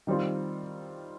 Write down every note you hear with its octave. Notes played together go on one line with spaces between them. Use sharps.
D#3 G3 C4 F4